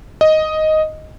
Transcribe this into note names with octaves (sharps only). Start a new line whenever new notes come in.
D#5